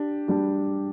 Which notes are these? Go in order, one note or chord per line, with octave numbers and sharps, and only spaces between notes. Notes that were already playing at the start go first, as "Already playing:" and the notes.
Already playing: D4 G4
G3 D4 G4